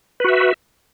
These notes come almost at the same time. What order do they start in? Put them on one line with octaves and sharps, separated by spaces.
B4 F#4 E5